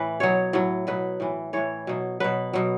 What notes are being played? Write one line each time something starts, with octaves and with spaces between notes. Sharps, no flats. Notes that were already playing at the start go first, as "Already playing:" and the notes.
Already playing: A2 E3 B4
B2 F#3 C#5
A2 F#3
B2 F#3 B4
A2 E3
A2 E3 C#5
B2 F#3
B2 F#3 B4
B2 F#3